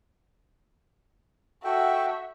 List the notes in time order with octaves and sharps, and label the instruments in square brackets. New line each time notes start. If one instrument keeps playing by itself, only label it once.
[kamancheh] F#4 E5 [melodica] A4 G5